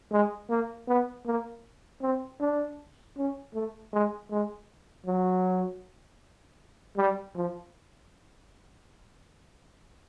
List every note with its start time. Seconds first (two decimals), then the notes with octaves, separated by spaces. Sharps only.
0.11 G#3
0.49 A#3
0.88 B3
1.26 A#3
2.02 C4
2.40 D4
3.17 C#4
3.54 A3
3.93 G#3
4.31 G#3
5.06 F#3
6.97 G3
7.35 F3